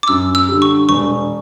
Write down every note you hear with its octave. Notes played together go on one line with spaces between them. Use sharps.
D6
F#2 E6
E6
D3 G3
C#6
E1 C#6